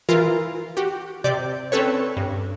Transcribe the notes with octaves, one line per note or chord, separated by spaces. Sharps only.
E3 F4 A#4
F#4 G4
C3 D5 G6
C4 C#4 A4 B4 C#5
G2